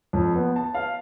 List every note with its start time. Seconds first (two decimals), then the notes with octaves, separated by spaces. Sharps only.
0.13 F2
0.36 B3
0.56 A5
0.74 F5